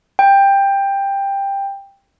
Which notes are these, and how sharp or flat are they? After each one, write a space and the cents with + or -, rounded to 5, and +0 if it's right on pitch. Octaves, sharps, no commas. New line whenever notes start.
G5 +15